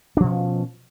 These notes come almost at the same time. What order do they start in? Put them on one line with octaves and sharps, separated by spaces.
D4 F3 B2 C#4